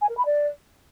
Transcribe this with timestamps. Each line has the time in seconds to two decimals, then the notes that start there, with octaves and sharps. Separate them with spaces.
0.01 G#5
0.09 A#4
0.17 B5
0.25 D5